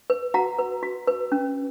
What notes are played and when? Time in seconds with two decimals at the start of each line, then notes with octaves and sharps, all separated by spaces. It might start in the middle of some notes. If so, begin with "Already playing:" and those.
0.10 B4
0.34 F#4 F#5 A#5
0.59 B4
0.83 F#4
1.08 B4
1.32 C#4